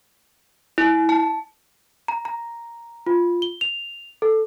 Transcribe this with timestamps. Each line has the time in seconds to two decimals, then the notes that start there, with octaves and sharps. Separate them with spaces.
0.78 E4
1.09 A5
2.08 A#5
2.25 A#5
3.07 F4
3.42 G7
3.61 F7
4.22 A4